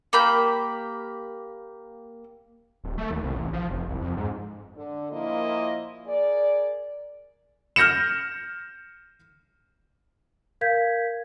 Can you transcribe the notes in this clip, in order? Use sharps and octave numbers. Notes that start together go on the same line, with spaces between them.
A#3 G4 B5 G6
D1
A3
D#2
C2
A1
F3
F1
C2
F2
G#2
D3
A#2 F3 A#3 E4 D#5
G#4 A#4 D5
F6 G6 A#6 C#7 E7
A#4 F5 G6 G#6 B6